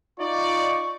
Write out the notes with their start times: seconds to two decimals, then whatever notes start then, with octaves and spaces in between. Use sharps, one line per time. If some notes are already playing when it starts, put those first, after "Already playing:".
0.19 D#4 F4 D5 C#6